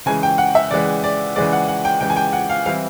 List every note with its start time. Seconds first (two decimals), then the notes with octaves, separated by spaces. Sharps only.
0.06 C#3 E3 G#3 G#5
0.23 G5
0.38 F#5
0.55 E5
0.71 C#3 E3 G#3 D5
1.04 D5
1.36 C#3 E3 G#3 D5
1.53 F#5
1.68 F#5
1.85 G5
2.01 C#3 E3 G#3 G5
2.10 G#5
2.16 G5
2.33 F#5
2.49 F5
2.66 E3 G3 C4 E4 F5